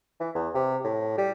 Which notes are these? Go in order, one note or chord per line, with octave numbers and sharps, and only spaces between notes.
E3
E2
C3
A2
G3